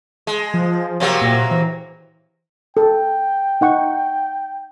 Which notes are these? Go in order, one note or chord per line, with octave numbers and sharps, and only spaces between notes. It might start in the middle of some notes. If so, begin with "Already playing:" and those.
G#3
F3
C3 F#3 A#3
A#2
E3
A4 G5
D#4 F#5 C#6